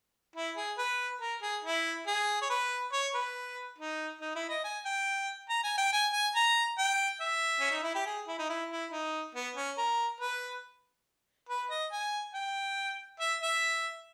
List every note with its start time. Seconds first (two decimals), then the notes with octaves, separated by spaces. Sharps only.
0.36 E4
0.57 G#4
0.78 B4
1.21 A#4
1.42 G#4
1.64 E4
2.07 G#4
2.42 C#5
2.50 B4
2.93 C#5
3.14 B4
3.78 D#4
4.21 D#4
4.35 E4
4.49 D#5
4.64 G#5
4.85 G5
5.49 A#5
5.64 G#5
5.78 G5
5.93 G#5
6.13 G#5
6.35 A#5
6.78 G5
7.21 E5
7.60 C#4
7.71 D#4
7.83 E4
7.95 G4
8.06 G#4
8.28 E4
8.39 D#4
8.49 E4
8.71 E4
8.92 D#4
9.35 B3
9.56 C#4
9.78 A#4
10.21 B4
11.49 B4
11.71 D#5
11.92 G#5
12.34 G5
13.20 E5
13.42 E5